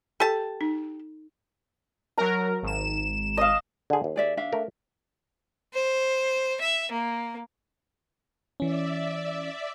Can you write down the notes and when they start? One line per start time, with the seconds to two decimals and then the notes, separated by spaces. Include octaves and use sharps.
0.20 G4 A4 A5
0.61 D#4
2.18 F#3 A#4 A#5
2.63 G#1 E7
3.37 D#5 F5
3.90 D3 G#4
4.04 D#2
4.16 G#4 D5 E5
4.37 D4 E5 F5
4.53 A3 A#4
5.74 C5
6.61 E5
6.92 A#3
8.60 E3 C#4 D5 E5